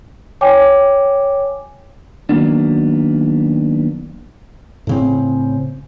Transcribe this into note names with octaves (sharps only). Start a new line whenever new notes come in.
C#5 G5 G#5 D6
D#3 E3 F#3 A#3 B3 D4
A2 C#3 C4